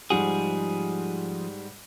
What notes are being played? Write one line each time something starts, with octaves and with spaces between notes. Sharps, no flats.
G#2 F3 G3 G#4 F#5